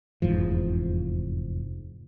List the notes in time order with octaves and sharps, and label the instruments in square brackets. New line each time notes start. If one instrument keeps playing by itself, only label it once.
[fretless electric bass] F1 E2 G#2 F3